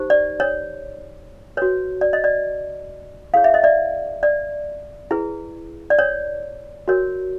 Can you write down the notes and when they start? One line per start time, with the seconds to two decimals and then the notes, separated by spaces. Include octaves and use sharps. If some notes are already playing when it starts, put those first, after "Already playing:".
Already playing: D#4 G4 C5
0.10 D5
0.40 C#5
1.57 F#4 B4 C#5
2.01 D5
2.13 D#5
2.24 D5
3.34 E4 G#4 C#5 F5
3.44 E5
3.54 D#5
3.63 D5 E5
4.23 D5
5.11 E4 G#4 B4
5.90 D5
5.99 C#5
6.88 F#4 A#4 C#5